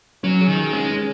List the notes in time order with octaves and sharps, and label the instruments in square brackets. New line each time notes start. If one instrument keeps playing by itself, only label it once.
[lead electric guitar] F#3 [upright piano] C#4
[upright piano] G#4
[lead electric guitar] D#3
[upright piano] G#4
[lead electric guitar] G#3 [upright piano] C#4
[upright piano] C#4